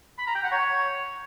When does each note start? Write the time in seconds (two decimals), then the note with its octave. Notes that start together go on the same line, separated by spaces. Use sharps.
0.18 B5
0.27 A#5
0.35 G5
0.43 F#5
0.52 C#5